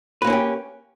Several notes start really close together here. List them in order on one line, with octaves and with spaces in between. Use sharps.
B4 A#3 C#4 E4 G4